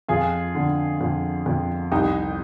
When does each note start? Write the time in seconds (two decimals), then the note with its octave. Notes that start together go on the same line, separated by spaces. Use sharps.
0.08 F2 F4 G#4
0.55 D3
1.01 F2
1.46 F2
1.91 C2 D#4 G4